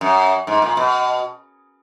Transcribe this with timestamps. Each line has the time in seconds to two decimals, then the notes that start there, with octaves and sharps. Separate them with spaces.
0.01 F#2
0.47 G#2
0.62 A#2
0.77 B2